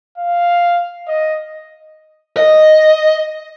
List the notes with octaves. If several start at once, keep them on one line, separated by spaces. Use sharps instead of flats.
F5
D#5
D#5